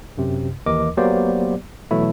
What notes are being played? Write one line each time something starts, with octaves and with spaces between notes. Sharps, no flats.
F#2 C3
D#2 E3 A#4 D#5 D6
F#3 A#3 B3 G4 C5 D5
B2 E3 F#3 A3 E4